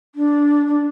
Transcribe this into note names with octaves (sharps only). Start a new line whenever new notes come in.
D4
D4